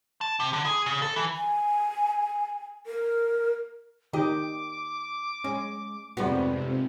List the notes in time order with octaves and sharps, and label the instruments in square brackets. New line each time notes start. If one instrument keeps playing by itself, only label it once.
[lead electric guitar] A5
C3
D3
G#4
C#3
A4
E3
[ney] G#5
A#4
[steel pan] D#3 G4 [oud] D#5 [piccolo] D6
[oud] G#3 [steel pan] C#4
[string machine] F2 C3 [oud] G#2 B3 [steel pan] G3 F#4